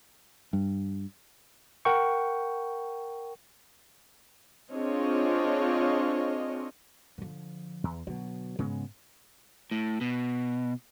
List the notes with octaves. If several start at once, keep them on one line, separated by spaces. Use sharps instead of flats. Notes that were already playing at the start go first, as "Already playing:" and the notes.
G2
A#4 F#5 G5 C#6
C4 D4 F4 G#4 C#5 D#5
D3 F3
E2
B2 D3 F#3
G#2 C#3 G#3 B3
A2
B2